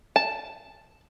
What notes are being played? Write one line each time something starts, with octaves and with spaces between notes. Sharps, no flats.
A5